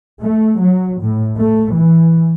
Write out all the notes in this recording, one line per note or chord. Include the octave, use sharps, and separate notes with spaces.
A3
F#3
A2
A3
E3